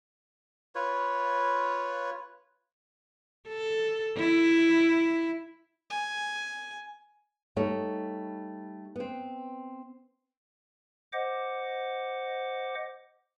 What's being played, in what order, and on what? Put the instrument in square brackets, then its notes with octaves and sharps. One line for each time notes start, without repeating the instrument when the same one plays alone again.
[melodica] F4 B4 C#5
[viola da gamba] A4
E4
[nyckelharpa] G#5
[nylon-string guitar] G3 A3 D#4 C#5
B3 C4
[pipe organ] C5 D#5 F#5 D6